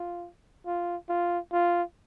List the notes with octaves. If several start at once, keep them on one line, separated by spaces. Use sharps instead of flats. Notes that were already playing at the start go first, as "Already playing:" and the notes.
Already playing: F4
F4
F4
F4